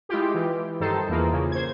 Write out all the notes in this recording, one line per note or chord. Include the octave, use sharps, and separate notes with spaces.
G#3 E4 F4 G4
E3
G2 D#3 D#4 A4 C5
E2 E3 A#3 F4 G#4
C#3 A#3
C5 G#6